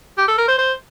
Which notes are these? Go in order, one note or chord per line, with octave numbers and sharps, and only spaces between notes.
G4
A4
A#4
C5
C5